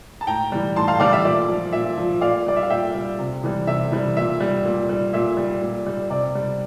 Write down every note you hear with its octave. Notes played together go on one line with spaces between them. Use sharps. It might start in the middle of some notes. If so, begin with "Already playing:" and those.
A5
A2 G5 A#5
E3 G3
A2 A5 C6
F5 A5
E3 G3 D5 F5
E5
A#2 D5
F3
A#2 E5
F3
A#2 D5 F5
G3 D5
E5
F5
A#2 E5 G5
G3
C3
E3 G3
C3 E5
E3 G3
A#2 E5
G3
A#2
G3
A#2 E5
G3
A#2
G3
C3 D5
G3